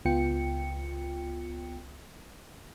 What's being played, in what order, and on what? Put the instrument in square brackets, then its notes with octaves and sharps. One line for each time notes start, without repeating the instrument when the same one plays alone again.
[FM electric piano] C#2 B3 F4 G5 C#7